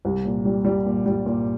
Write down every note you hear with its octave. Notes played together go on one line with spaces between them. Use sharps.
C2
A#2
G3
G3
A#2
G3
A#2